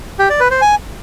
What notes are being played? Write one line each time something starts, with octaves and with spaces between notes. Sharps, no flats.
G4
D5
B4
C5
G#5